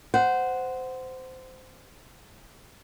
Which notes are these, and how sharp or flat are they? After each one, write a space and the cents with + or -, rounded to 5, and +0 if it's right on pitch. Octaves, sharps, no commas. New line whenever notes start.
C5 -15 F#5 +0